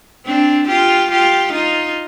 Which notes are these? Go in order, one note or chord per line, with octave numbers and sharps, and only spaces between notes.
C4 D4
F4 G4
F4 G4
D#4 F4